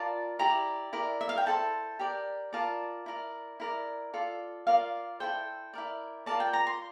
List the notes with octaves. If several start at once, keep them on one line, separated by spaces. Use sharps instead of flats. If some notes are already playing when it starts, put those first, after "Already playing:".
Already playing: F4 A#4 D5 A5
E4 G4 D5 A#5
E4 A#4 D5
E5
F5
G5
E4 A4 C5 A5
G4 A#4 D5
F4 A#4 D5 A5
E4 A#4 D5
E4 A#4 D5
F4 A4 D5
F4 A#4 D5 F5
E4 A4 C5 G5
E4 A#4 D5
F4 A#4 D5 A5
G5
A#5
C6